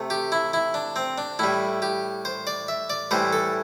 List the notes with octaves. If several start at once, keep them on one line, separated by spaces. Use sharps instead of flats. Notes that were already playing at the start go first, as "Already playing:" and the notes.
Already playing: C3 A3
G4
E4
E4
D4
C4
D4
A2 G3 E4
G4
C5
D5
E5
D5
A2 E3 G3 C5
A4